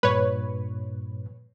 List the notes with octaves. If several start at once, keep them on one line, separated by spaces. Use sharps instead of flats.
G2 A#2 B4 C#5